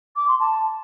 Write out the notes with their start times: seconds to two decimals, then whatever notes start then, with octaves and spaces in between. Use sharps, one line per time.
0.16 D6
0.28 C6
0.40 A5